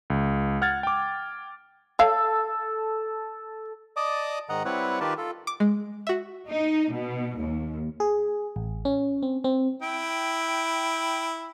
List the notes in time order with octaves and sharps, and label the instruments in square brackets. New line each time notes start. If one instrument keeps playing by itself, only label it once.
[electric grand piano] C#2
F#5 F6 G#6 A6
G5 D6
[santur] A4 [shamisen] C#5 F5
[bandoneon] D5 D#5 A5 D6 D#6
G#2 D#3 D#5 F#5 A#5
G3 C4 E4 B4 C#5 F#5
D#3 F4 G4 A#4 B4 A5
F4 A4
[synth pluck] D6
G#3
F#4 E5
[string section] D#4
B2
D#2
[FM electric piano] G#4
A1
C#4
C4
C4
[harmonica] E4 [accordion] G5